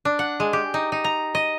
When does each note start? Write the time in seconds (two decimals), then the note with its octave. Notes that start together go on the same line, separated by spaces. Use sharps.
0.05 D4
0.19 F#5
0.40 G#3
0.53 G4
0.74 D#4
0.92 D#4
1.04 A#5
1.35 D#5